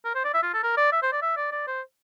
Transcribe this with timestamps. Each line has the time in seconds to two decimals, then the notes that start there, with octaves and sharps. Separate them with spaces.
0.05 A#4
0.15 C5
0.24 D5
0.34 E5
0.43 F4
0.54 A4
0.63 A#4
0.77 D5
0.92 E5
1.02 C5
1.12 D5
1.22 E5
1.37 D5
1.52 D5
1.67 C5